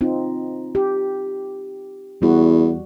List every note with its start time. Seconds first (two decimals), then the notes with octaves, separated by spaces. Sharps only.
0.01 C4 D#4 F4
0.75 G4
2.22 E2 G3 F#4